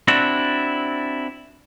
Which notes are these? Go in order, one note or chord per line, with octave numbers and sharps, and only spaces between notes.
C4 D4 E4 F#4